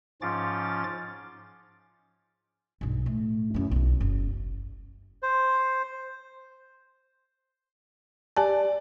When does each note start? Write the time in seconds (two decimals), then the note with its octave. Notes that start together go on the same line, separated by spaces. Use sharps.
0.22 G#2 F3 C#4 F4 D6 A6
2.81 B1 G2
3.06 A2
3.54 F#2 E4
3.71 B1 E4
4.01 F#1
5.23 C5
8.37 G4 D5 G#5 A5